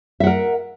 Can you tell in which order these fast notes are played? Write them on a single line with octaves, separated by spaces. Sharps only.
E5 F#5 A#4